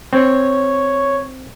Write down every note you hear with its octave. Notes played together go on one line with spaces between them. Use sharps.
C4 C#5